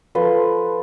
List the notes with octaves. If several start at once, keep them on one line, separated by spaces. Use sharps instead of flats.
F3 A4 B4 C6